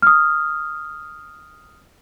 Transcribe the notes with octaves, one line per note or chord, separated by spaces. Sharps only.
D#6 F6